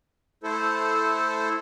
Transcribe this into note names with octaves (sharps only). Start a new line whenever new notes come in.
A3 E4 A4 C5